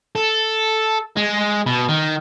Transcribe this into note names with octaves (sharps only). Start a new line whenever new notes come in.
A4
G#3
B2
D#3